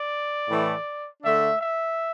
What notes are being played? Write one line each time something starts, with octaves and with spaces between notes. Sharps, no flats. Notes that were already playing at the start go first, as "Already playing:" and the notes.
Already playing: D5
A2 E3 A3
D3 A3 D4 E5
E5